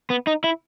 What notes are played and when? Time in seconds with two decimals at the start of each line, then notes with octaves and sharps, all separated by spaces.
0.10 B3
0.27 D#4
0.44 E4